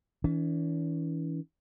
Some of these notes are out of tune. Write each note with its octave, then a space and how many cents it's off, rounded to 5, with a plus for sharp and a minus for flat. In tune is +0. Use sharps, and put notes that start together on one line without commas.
E3 -30 C#4 +40